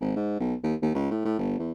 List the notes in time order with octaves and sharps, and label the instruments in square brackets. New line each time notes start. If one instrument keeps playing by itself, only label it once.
[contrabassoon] G#1
G#2
B1
D#2
D#2
C#2
A2
A2
G1
E2